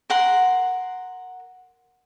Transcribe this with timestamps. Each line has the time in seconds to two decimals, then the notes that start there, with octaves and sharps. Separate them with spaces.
0.10 A#4 F#5 C6